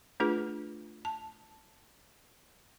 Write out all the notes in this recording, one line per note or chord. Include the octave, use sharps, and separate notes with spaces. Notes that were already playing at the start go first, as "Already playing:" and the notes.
A3 D4 F4 G#4 B4
A5